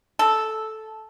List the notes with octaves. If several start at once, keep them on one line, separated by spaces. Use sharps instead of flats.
A4